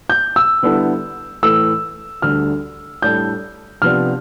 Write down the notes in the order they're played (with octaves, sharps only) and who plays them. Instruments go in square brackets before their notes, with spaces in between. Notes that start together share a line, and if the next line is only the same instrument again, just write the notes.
[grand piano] G6
E6
[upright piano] D3 G3 B3 E4 A4
[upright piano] A2 E3 A3 [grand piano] E6
[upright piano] D2 D3 G3 D4 [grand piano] F6
[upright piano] A2 G3 D4 A4 [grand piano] G6
[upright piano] C3 F3 B3 D4 [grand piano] F6